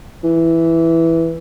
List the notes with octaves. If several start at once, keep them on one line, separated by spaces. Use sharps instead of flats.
E3